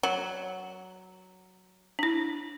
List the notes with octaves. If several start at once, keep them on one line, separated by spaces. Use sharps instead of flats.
F#3
D4 E4